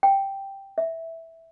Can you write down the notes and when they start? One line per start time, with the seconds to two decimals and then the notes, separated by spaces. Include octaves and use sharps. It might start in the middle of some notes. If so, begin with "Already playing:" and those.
0.03 G5
0.78 E5